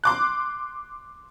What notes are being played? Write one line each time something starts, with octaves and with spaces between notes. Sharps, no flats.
C6 D6 F#6